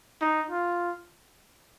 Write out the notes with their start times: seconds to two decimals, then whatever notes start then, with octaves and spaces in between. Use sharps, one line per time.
0.21 D#4
0.51 F4